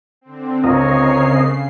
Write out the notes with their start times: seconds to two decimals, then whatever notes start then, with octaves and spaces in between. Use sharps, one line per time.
0.21 D3 C4
0.64 C#2 C#3 C4 A#4 C#5 D#5 C7